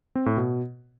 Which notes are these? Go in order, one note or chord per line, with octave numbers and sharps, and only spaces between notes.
C4
A2
B2